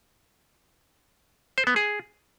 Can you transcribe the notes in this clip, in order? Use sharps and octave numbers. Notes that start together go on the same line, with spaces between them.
C5
B3
G#4